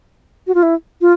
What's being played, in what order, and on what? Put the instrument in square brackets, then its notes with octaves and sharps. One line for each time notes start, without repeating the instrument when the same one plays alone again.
[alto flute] F#4
F4
E4
F4